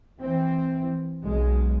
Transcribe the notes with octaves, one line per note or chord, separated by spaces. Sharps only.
E3 C4
B1 G#3